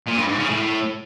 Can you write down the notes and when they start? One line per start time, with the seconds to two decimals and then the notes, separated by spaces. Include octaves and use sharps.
0.07 A#2
0.17 G2
0.28 G#2
0.39 C#3
0.50 A2